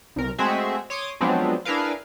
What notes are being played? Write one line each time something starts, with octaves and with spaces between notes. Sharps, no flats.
C2 A#4
G#3 A3 C4 F#4 G#4 E5
C#5 C6 D6 D#6
F3 F#3 G#3 B3 C4 D4
D4 E4 G#4 A#4 B4 F5